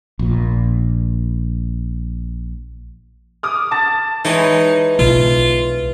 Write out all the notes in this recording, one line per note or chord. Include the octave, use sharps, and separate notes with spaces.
A#1 A#2
D6 D#6 F6
A5 A6
E3 G#3 D#4 C#5
B1 F4